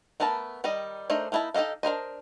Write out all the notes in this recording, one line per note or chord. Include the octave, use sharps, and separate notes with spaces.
A3 B3 A#4 B4 A5
D#3 G3 D#4 D#5
A3 D4 D#4 A#4 C5
A#3 D#4 E4 B4 A5
D#4 G4 A4 D#5 F5
D4 A#4 C5 D#5